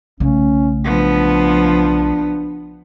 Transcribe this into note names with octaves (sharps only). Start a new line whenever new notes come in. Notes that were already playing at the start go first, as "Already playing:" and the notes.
B1 C#3 A3 C#4
F3 B3 D4